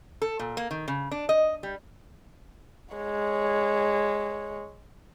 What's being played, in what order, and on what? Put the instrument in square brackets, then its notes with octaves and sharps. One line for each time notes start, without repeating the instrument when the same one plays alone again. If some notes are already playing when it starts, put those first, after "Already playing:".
[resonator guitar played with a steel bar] A4
A#2
A#3
D#3
C#3
D4
D#5
G3
[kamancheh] G#3 C#5